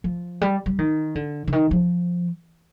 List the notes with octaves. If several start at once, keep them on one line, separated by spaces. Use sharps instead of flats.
F3
G3
G3
D#3
D3
D3
D#3
F3